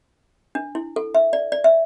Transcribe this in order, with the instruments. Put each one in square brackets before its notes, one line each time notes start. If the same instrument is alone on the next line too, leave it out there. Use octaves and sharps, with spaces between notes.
[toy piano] D4
E4
A4
E5
D5
D5
E5